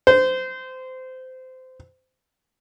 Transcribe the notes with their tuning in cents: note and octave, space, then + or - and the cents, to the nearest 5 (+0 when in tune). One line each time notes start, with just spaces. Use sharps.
C5 -20